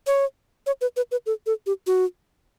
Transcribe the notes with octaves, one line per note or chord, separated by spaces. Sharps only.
C#5
C#5
B4
B4
B4
A4
A4
G4
F#4